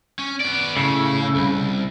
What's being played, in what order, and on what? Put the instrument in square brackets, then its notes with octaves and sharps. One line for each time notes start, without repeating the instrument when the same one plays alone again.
[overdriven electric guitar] C#4
B3 D5
[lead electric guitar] C#3 [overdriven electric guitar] A3 E4
[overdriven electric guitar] C2